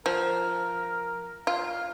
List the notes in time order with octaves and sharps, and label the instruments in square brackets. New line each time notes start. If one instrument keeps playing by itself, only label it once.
[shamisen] F3 [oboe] A#4
[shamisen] F4 [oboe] F5